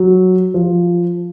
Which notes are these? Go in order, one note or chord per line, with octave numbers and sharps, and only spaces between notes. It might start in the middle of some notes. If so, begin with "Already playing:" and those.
Already playing: F#3
F3